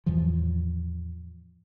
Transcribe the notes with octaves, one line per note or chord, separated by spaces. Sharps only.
E2 A2 E3 F3